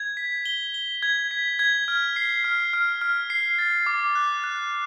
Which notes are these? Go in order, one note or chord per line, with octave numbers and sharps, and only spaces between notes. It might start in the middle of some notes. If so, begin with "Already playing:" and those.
Already playing: G#6
B6
G7
G7
G#6
B6
G#6
F6
C7
F6
F6
F6
C7
A6
D6
F#6
F#6